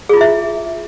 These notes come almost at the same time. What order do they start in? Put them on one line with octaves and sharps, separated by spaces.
G#4 F4 E4 E5